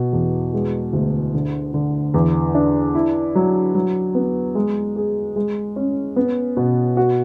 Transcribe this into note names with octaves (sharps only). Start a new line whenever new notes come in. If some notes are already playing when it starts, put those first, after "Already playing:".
Already playing: B2
E2
G#3
D2
D3
D3
E2
D4
E4
F#3
F#3
B3
G#3
G#4
G#3
C#4
B3
B2
F#4